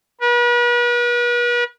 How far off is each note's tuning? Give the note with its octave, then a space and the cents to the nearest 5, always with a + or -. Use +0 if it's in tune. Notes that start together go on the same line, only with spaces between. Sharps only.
B4 -40